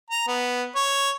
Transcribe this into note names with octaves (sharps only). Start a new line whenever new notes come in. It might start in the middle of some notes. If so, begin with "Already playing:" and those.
A#5
B3
C#5